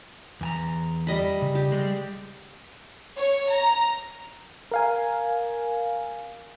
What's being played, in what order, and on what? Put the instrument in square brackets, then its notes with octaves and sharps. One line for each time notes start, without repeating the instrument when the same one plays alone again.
[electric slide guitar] E2 G#5 A#5
[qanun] G3 D#5 B5
[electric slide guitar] C#3
[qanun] G4
[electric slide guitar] G3 G#3
[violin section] C#5
A#5
[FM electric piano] A#4 F5 G#5